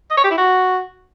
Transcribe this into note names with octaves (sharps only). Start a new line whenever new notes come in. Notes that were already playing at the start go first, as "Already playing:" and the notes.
D#5
C#5
G4
E4
F#4